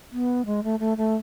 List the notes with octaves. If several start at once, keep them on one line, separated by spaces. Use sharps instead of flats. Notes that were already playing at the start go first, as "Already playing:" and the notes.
B3
G#3
A3
A3
A3